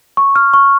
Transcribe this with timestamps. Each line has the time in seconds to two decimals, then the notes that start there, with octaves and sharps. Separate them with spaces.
0.17 C#6
0.36 F6
0.54 C#6